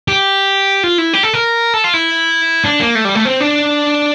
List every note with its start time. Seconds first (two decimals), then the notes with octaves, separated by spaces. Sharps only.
0.08 G4
0.83 F4
0.98 E4
1.14 G4
1.23 A4
1.34 A#4
1.74 A4
1.84 F4
1.94 E4
2.65 D4
2.80 A#3
2.95 A3
3.05 G3
3.15 A3
3.25 C4
3.41 D4